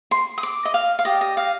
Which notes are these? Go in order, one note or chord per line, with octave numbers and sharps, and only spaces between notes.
C6
D#6
D6
D#5
F5
F5
G4 D5 D#5
D#5
F5